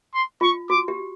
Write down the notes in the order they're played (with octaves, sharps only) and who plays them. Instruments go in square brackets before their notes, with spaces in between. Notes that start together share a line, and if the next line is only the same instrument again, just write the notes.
[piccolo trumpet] C6
[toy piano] F4 [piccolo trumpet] C#6
[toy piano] F#4 [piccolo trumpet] D6
[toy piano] G4